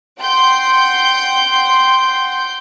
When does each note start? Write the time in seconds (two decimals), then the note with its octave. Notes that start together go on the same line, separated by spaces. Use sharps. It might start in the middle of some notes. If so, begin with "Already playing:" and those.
0.20 F#5 G5 C6 G6